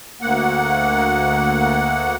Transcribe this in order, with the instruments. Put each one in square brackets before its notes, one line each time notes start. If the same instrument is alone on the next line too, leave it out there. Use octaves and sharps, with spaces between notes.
[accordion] D2 A#3 F#5